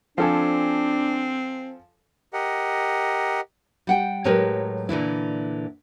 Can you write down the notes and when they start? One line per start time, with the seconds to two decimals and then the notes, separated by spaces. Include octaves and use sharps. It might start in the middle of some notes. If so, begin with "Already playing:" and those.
0.18 F3 C4 D4 A4 G#5
2.33 G4 A#4 D#5 F#5
3.87 G3 F#5 G5
4.25 A2 F#3 G#3 G4 A#4 B4
4.89 A#2 D3 E3 E4